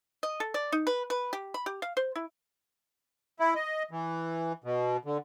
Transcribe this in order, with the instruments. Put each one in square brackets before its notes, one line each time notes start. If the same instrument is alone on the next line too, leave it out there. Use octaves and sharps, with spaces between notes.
[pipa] D#5
A4
D5
D#4
B4
B4
G4
B5
G4
F5
C5
E4
[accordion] E4
D#5
E3
B2
D3